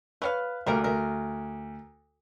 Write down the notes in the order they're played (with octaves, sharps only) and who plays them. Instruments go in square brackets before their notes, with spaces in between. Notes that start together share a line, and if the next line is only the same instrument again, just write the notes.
[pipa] A3 C#5 F5 [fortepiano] B4
[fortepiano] D2 [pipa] G3 A#3 A#4
[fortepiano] D2 [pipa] A#4